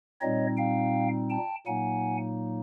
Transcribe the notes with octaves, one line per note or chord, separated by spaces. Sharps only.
A#2 G3 C4 D#4 C#5 D#5
F5 G5
G5 A5
A#2 F#3 A#3 D#4 F#5 G#5